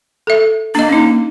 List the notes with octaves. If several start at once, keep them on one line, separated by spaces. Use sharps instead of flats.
A4 E5
A#3 D4 D#5
C#4 D#4